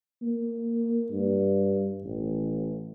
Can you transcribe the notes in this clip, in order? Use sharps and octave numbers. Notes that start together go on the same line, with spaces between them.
A#3
G2
A1